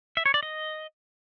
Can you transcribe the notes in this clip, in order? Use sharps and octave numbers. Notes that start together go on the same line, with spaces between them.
E5
C#5
D5
D#5